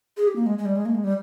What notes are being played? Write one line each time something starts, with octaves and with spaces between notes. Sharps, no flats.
G#4
G4
A#3
G#3
G#3
G3
G#3
A#3
G#3
G3